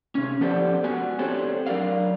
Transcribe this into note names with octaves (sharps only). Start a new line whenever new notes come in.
C3 C#4
F3 B3 G4 A4 C5 D5
B3 F#4 G#5
C4 D4 G4 A4 C5 C#5
F#3 D4 A#4 D5 F5